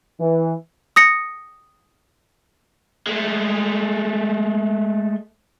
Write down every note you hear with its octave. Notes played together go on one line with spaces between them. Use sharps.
E3
D#6 A#6 C#7
G#3 A3